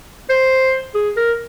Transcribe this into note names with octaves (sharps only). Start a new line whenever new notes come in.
C5
G#4
A#4